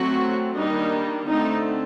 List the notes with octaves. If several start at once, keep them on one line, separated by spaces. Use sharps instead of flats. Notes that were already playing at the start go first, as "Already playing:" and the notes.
Already playing: F#3 A3 C4 F#4
D#3 G3 A#3 D4 D#4
D3 A3 C4 D#4